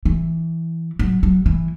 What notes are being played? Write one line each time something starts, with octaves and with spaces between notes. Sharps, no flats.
E3
F#3
F#3
E3